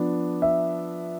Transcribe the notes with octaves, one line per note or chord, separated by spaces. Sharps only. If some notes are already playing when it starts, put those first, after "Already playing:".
Already playing: F3 B3 D4
E5